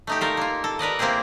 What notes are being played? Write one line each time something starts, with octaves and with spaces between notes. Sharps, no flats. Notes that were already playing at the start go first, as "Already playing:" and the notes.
A3 D#4 G4
F4 A4 A#4
A#3 F4
A4
A#4 B4 D5 D#5
A#3 C4 E4 G4 G#4